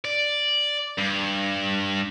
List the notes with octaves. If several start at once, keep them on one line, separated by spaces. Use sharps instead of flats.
D5
G2